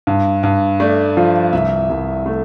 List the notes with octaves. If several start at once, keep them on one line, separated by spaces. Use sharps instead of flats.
G2
G2
A3 D5
F3
C2 E5
C2
A3